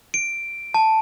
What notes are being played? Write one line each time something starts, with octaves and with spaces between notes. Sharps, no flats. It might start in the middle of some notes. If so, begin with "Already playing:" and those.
D7
A5